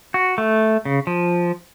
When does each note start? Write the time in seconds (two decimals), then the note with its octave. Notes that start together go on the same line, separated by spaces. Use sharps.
0.14 F#4
0.38 A3
0.85 C#3
1.07 F3